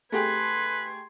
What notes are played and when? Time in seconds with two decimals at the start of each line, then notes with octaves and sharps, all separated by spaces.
0.12 A3 G4 G#4 B4 C6 G#6